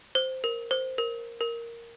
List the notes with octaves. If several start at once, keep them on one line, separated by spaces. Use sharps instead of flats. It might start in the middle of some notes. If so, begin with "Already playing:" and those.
C5
A#4
C5
A#4
A#4